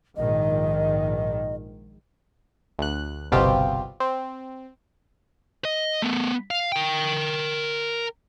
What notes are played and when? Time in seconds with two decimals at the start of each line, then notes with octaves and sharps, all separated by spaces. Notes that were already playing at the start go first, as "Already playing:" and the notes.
0.16 A#1 G#2 D#3 D#5
2.79 D2 F#6
3.32 G1 C2 B2 C4 F4 G4
4.00 C4
5.65 D#5
6.02 A3 B3
6.51 F5
6.72 A#4 G5